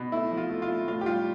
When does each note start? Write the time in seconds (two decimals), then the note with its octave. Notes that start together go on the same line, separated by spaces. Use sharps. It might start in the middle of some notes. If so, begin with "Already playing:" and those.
Already playing: B2
0.12 A3 E4
0.31 F3
0.37 F4
0.49 A3
0.62 F4
0.69 A3
0.88 A2 F4
1.01 G4
1.06 G3 F4